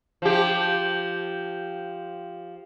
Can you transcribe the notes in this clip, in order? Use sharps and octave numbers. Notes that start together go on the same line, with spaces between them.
F3 G4